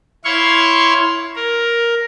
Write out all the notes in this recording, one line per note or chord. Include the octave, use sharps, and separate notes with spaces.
E4 C#5 F5 C6 C#6
A#4